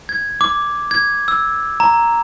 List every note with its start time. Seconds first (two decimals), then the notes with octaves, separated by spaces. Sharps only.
0.09 G#6
0.41 D6
0.91 G#6
1.28 E6
1.80 A#5